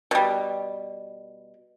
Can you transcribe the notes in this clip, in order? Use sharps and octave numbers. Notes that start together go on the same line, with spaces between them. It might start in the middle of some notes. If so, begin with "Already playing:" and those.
B2 G3